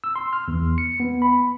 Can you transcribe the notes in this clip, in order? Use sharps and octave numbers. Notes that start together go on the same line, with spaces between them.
E6
C6
F6
E2
C#7
B3
B5